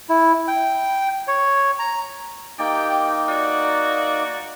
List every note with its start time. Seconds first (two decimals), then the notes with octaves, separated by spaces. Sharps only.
0.09 E4
0.48 G5
1.28 C#5
1.79 A#5
2.59 A#3 D#4 G4 D5 G5
3.28 F#4 D5